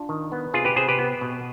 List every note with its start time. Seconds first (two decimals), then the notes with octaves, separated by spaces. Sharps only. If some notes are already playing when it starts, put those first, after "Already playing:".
Already playing: D4 F4
0.09 D#3
0.32 B3
0.54 C3 F4 G#4
0.65 G4 B4
0.76 C3 G#4 C5
0.88 G4 B4
0.99 B3
1.21 B2